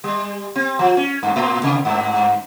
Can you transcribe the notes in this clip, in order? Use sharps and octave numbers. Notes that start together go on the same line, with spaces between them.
G3
C4
F3
C#4
G2
A2
C3
G2